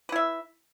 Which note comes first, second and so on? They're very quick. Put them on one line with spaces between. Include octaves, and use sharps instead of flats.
B4 E4 E5